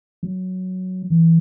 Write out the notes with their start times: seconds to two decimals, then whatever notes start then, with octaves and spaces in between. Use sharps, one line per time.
0.23 F#3
1.10 E3